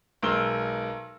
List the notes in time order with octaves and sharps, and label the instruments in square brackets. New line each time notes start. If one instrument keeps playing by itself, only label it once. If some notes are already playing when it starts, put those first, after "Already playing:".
[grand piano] B1 G#3 A#4 E6 G7